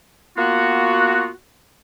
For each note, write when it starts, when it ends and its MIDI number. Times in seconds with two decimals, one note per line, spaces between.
0.37 1.30 58
0.37 1.30 59
0.37 1.30 65
0.37 1.30 66